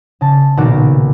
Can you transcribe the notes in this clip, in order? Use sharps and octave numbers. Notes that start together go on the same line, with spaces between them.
C#3 A5
B1 A#2 D#3 F#4 F#5 D6